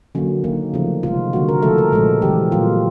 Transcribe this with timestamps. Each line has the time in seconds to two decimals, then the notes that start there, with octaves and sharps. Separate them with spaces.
0.15 D3 F#3 A#3 C#4
0.44 D#3 F#3 A#3
0.74 C#3 F3 A3
1.03 C3 D#3 G#3 F4
1.33 D3 G3 A#3 F#4
1.49 A#4
1.63 C#3 F3 A3 A4
1.78 A#4
1.92 A#2 F3 G#3 A4
2.22 C#3 E3 G3 G4
2.52 A#2 F#3 A#3 F4